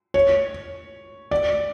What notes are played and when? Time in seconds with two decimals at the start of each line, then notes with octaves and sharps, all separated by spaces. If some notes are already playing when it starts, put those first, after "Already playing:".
0.14 C#5
1.31 D5